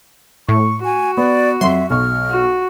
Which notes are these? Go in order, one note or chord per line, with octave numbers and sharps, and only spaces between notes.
A2 C#6
F#4 G#5
B3 D5
F2 F#3 E5 C6
B1 C#6 F6
F#4